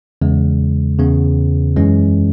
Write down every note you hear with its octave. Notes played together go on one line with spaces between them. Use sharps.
E2 C#3 G#3
E2 C#3 E3 B3
F#2 E3 G#3 C#4